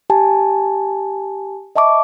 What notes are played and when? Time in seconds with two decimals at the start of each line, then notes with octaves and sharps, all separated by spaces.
0.10 G4 G#5 A5
1.76 D#5 E5 A5 C#6 D6